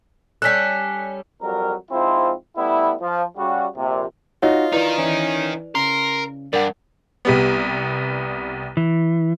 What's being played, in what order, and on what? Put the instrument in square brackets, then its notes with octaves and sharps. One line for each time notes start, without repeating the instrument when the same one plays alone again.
[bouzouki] G3 C#4 A4 [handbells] F#6 B6
[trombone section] F2 F#3 G3 A#4
G#2 F3 C4 E4 F4 C5
G3 A3 B3 E4
F3
C#3 G3 F#4
A#1 C3
[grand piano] D#4 F#4 [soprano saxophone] F4 [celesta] C#5 D#5
[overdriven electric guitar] D#4 A#4 [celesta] E4 B4 D5 [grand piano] F7
[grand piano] E3 [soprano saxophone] C#4
[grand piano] C#3 [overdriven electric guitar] A#4 [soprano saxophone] C6
[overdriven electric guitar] G2 [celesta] A#4 F#5 [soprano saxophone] D5
[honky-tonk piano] C2 G3 B3
[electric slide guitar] E3